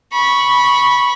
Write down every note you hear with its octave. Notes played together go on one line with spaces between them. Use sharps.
B5 C#6